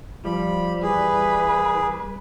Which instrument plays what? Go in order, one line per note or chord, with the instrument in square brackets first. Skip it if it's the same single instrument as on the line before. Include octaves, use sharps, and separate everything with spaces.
[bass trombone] F3 [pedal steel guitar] G3 [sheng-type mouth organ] B5
[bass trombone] E3 [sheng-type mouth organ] G#4 [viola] B4